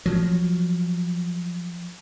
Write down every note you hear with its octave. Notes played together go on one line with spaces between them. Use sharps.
F3 F#3